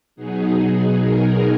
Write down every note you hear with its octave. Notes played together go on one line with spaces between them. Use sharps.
B2 F#3 B3 D#4 G#4
A#4